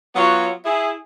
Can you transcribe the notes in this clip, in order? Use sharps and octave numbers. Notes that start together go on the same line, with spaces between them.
F#3 B3 F4 F#4 C#5
E4 G#4